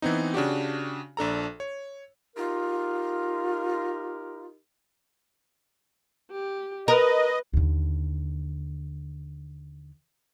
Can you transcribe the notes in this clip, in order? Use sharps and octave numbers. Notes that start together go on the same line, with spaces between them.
E3 B3 C4 D#4
C#3 D4 F#4 G4
A#1 D4 A4 A#5
C#5
D#4 F4 G4 A#4
G4
A#4 B4 D#5
D#2 D3